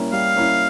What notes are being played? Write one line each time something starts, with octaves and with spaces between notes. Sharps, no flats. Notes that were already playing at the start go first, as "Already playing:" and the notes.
Already playing: G3 A#3 C#4 E4
G3 F5
A#3 C#4 E4